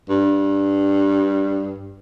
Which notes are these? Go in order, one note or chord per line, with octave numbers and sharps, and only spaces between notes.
G2